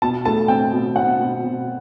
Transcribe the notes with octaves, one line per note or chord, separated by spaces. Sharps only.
B2 A5
A3 A5
C4 G5
B2
C4 F#5
B2
B2